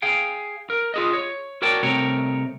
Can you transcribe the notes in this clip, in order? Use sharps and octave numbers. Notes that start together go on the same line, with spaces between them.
G#4 F5 G5
A#4
F4 G#4 D#5
C#5
F#4 A#4 C#5 D5 G5 A5
C2 C3 A3 A#4 C#5 G5